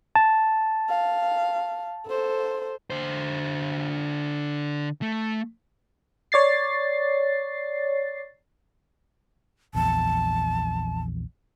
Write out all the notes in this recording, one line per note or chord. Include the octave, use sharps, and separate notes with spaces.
A5
F5
A4 C5
D3 C5
A3
C#5 D5 A6 C7
A#1 E2 A5